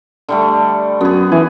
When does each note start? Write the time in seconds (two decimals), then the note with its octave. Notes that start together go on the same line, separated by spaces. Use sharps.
0.28 D3 G3 A3
1.01 F#2 B3 G#4
1.32 E3 G#5